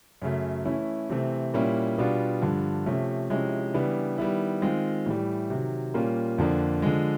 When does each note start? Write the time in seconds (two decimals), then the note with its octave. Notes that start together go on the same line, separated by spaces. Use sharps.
0.22 F#2 C#3 F#3 A3
0.65 E3 A3 C#4 E4
1.10 C3 E3 A3 C4
1.54 A#2 G3 A#3 C#4 E4
1.98 B2 G3 B3 D4 F4
2.42 G2 D3 F3
2.86 C3 F3 A3 C#4
3.30 C3 F3 G#3 C#4 E4
3.74 C#3 E3 G3 B3 D4
4.18 D#3 G3 B3 E4
4.62 D#3 G#3 C4 F4
5.06 A2 E3 G3
5.50 C3 D#3 F#3
5.94 A#2 G3 A#3 C#4 F4
6.38 F2 D3 F3 A#3 D4
6.82 D3 F3 G#3